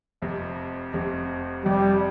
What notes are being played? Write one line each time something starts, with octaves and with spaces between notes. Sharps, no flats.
F1 F2 C3
F1 F2 C3
F1 F2 C3 G3